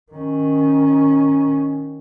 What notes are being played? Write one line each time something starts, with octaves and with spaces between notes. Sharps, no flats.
D#3 C#4